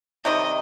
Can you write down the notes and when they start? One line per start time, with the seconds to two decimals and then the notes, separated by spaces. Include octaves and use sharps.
0.25 C3 D#3 G3 D#5